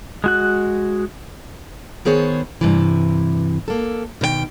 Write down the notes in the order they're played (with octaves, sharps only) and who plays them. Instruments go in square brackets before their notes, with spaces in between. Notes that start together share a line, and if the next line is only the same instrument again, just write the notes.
[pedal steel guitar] G#3 F#4 F#6
[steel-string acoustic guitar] D#3 B3 G#4 C5 C#5
G2 C3 E3
A#3 A4
B2 D#3 A#4 G5